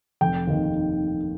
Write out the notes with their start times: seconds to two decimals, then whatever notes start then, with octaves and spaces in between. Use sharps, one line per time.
0.21 F1 G5
0.47 D#2 D#3